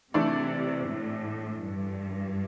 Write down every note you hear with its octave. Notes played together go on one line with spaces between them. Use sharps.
C3 E3 A3 D4 A4 D5
A2
G2